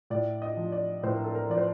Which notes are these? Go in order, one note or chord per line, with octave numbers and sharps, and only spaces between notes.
A2 D5
D#5
F3
D5
A2 C5
A#4
A4
A#4
F3 D5
C5